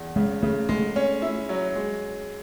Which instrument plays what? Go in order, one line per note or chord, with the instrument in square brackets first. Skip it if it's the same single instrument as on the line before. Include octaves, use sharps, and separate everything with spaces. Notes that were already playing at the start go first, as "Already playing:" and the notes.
Already playing: [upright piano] E2
[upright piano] C#3 [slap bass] G#3
[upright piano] C#3 [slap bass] A3
[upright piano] G#3 [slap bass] A3
[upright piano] C#4
E4
F#3
G#3